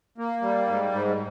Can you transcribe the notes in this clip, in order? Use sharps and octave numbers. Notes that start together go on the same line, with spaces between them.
A#3
G3
G#2
G#2